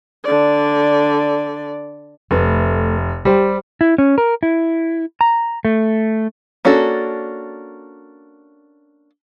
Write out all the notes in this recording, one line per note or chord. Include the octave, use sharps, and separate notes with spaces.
D3 D5
F1 A3 B4
G3 G4 C5
E4
C#4
A#4
E4
A#5
A3
A#3 C#4 D4 F#4 A4